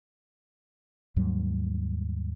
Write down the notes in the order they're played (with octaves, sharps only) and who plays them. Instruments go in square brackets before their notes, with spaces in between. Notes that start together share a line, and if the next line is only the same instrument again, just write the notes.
[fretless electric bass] D#2 G#2 F#3 G3